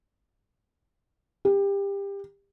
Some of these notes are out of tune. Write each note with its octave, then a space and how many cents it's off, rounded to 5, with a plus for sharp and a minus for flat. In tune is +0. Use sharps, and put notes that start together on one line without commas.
G4 +25